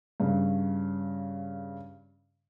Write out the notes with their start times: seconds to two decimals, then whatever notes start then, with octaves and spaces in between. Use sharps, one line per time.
0.20 G2 C#3